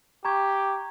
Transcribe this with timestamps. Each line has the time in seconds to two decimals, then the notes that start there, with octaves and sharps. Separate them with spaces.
0.25 G4 A#5 C#6 G#6